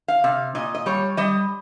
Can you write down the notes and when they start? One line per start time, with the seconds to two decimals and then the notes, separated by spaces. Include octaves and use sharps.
0.08 F5
0.24 C3
0.55 A#2 D#5
0.75 D#5
0.86 G3 C#5
1.17 G3 D#5